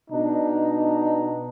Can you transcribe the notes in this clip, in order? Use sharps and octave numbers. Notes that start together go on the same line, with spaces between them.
B2 D4 D#4